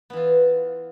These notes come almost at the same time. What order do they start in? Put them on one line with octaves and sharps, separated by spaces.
B3 E3 F4